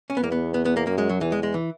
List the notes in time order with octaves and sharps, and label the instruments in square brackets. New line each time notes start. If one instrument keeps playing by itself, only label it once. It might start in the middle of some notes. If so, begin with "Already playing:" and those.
[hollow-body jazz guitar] C#4
B3
[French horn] E2 [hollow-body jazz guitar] A#3
[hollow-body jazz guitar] B3
B3
B3
A#3
[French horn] F#2 [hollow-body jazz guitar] A#3
[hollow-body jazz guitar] G#3
F#3
[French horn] E2 [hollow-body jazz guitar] E3
[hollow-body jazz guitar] G#3
G#3
E3